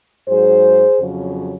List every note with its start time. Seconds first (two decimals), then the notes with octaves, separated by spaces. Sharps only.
0.28 G#2 F#3 G#4 C5
0.99 F2 C#3 F#3